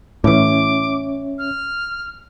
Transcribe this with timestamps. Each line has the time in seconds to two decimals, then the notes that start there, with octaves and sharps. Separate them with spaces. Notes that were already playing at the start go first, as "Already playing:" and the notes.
0.24 A2 E3 C#4 C#5 E5 D6
1.39 F6